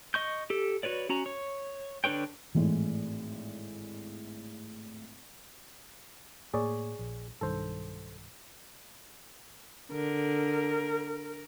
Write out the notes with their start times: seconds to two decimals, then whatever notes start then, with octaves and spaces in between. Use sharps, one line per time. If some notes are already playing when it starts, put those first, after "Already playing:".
0.14 D#5 C#6 G6
0.50 G4 A4
0.83 F#4 B4 C#5 D5
1.09 C#4 F#4 A#5
1.26 C#5
2.04 D3 D4 B4 C#5 G5
2.55 G#1 A2 E3 G#3
6.54 A2 A#3 G#4 C#5 D5
6.99 A#1
7.41 B1 G2 D#3 A4 C5
9.93 D3 A#4